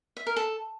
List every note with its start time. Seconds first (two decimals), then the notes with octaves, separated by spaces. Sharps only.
0.17 E5
0.27 A#4
0.36 A4